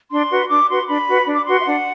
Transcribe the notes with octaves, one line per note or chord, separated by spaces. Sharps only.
D4 C6
F#4 B4
D4 D6
F#4 B4 C6
D4 B5
F#4 B4
D4
D6
F#4 B4 C6
E5
D4 F#5